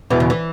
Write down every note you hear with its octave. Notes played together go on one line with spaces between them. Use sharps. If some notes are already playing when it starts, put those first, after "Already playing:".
E2 B2 E3 B3 E4
C#3
E3